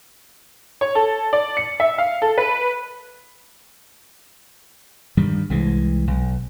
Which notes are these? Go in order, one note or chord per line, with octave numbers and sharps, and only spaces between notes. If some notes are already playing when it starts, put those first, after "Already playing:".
C#5
A4
D5
C#7
E5
F5
A4
B4
G2 D#3 G3
C2 E3 G#3
B1